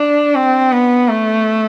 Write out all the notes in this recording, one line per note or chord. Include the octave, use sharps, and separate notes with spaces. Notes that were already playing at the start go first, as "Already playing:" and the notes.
Already playing: D4
C4
B3
A3